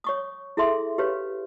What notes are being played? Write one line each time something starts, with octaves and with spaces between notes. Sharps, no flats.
C#5 C#6 D#6
E4 G#4 A4 E5 C6
G4 B4 C#5 F5